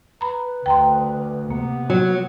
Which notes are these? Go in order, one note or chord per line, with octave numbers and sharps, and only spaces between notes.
B4 A#5 B5
D2 G5 A#5 C6
C3 A#3 B3
F#3